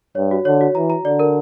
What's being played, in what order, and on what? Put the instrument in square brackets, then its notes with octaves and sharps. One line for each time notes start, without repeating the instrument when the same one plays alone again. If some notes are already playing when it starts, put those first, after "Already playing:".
[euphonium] G2 [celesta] C#5
[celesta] F#4
[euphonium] D3 [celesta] C#5
[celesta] F#4
[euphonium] E3 [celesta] A#5
[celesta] A#5
[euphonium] D3 [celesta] D5
[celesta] A#4